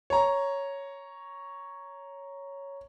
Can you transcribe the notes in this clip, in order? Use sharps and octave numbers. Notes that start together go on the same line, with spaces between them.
C#5 A#5